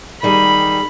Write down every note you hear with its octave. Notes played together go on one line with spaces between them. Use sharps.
D#3 G3 G#4 B5